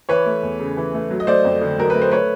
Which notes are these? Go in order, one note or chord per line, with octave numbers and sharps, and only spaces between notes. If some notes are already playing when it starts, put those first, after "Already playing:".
E3 B4 C#5
A3
E2
C#3
E3
A3
F#3
D#5
A3 C5 D5
F2
D3
F#3 A#4
A3 B4
C5
A3 B4 C#5